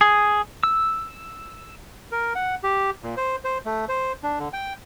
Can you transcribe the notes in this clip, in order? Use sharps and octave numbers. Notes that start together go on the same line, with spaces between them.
G#4
E6
A#4
F#5
G4
A#2
C5
C5
A3
C5
D4
D3
G5